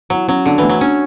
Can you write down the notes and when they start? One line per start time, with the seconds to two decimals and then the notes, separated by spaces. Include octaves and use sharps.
0.10 F#3 E4
0.28 F#3 C#4
0.45 D3 D4
0.58 E3 A3
0.69 F#3
0.81 C#4 D4